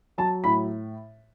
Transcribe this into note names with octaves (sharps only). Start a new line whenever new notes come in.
F#3 A5
A2 B5